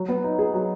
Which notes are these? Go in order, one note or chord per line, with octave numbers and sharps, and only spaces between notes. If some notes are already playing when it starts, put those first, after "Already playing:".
Already playing: F#3
B3
D#4
G#4
F#3